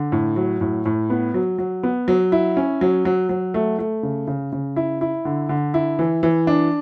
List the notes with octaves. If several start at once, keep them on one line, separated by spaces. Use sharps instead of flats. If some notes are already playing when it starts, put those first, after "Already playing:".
Already playing: D3
A2
F#3
A2
A2
B3
F#3
F#3
B3
F#3
E4
C#4
F#3
F#3
F#3
A3
A3
C#3
C#3
C#3
E4
E4
D3
D3
E4
E3
E3
D4